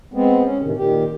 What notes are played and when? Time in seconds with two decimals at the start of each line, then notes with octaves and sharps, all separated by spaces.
0.14 G#3 B3 C4
0.44 C#4
0.62 A2 C3 D#3
0.77 A#2 D#3 G4